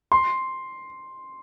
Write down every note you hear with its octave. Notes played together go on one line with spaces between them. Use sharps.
C6